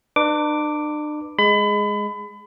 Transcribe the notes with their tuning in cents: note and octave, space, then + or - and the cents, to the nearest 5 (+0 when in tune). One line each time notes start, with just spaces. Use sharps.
D4 +40 B4 +0 D6 +0
G#3 +0 B5 +30